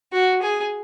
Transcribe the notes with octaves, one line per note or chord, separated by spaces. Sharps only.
F#4
G#4